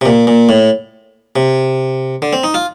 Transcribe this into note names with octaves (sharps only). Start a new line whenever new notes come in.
C3
A#2
A#2
A2
C3
D3
C4
D#4
F4